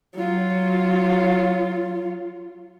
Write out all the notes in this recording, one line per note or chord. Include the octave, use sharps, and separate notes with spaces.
F#3 F4